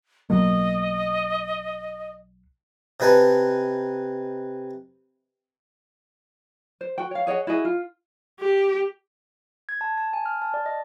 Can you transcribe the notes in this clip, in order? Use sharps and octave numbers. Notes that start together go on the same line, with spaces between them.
B1 F#3 A#3 D#5
C3 D#4 B4 G#5 A5
C5
F#4 G5
C#5 F5
G#4 C#5 D#5 F#5
E4 F#4 G#4 D#5
F4
G4
G#6
A5
A5
G#5
F6
A5
D5
D#5